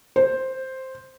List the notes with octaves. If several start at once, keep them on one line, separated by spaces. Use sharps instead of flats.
C5